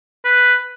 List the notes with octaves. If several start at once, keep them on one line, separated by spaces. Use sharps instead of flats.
B4